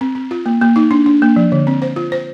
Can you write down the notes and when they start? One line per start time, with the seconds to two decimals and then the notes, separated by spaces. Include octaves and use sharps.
0.01 C4
0.15 C4
0.31 F4
0.46 A#3
0.61 A#3
0.76 D#4
0.91 D4
1.06 D4
1.22 A#3
1.36 F3
1.52 D3
1.67 C4
1.82 C5
1.96 F4
2.12 C5